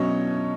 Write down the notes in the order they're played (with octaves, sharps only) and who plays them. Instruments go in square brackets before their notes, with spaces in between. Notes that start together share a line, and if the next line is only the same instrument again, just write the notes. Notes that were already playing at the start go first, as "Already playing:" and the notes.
Already playing: [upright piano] B2 F#3 C#4 C#5 D#5